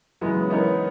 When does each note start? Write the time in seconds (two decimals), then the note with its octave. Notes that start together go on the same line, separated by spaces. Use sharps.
0.21 F#2 C#3 E3 G#3 B3
0.50 E3 B3 D#4 A#4 C#5